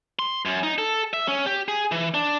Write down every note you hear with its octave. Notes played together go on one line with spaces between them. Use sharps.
C6
F#2
D#4
A4
E5
C#4
G4
G#4
E3
D4